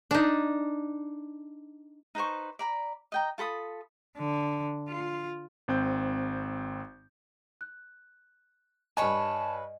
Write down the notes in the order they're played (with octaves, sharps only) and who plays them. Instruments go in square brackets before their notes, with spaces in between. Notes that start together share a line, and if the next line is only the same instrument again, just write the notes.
[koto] D4 D#4
[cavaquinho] D#4 B4 C5 C#6
D5 A#5 B5
D#5 G5 A#5
F4 A4 B5 D#6
[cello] D3
F4
[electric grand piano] G#1 C4 G6
[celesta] F#6
[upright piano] G2 G#5 [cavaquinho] B4 C#5 B5 [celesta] D#5 [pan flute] A5